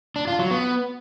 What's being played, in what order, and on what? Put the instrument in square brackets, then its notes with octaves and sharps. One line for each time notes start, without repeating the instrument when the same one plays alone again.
[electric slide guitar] D4
F4
F#3
B3